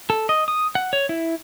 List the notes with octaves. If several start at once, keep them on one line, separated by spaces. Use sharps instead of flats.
A4
D#5
D#6
F#5
C#5
E4